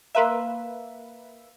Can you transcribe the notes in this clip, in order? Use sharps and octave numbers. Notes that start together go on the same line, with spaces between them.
A#3 B4 E5 F5 A#5 C6